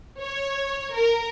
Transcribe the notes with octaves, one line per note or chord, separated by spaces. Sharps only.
C#5
A#4